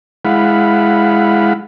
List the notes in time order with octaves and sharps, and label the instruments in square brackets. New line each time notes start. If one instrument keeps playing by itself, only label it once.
[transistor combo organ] G#3 E4 F5 F#5 B5